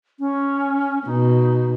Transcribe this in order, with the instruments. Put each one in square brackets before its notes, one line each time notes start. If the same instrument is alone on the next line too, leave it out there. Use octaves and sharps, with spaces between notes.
[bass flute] C#4
[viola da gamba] B2 [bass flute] D#4